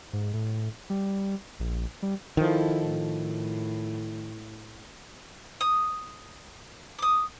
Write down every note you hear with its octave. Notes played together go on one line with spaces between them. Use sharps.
G#2
A2
G3
A#1
G3
D#3 F3 E4 A4
A2
D#6
D6 D#6